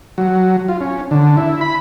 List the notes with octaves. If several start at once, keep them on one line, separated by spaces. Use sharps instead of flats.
F#3
F4
C#4
D3
E4
B5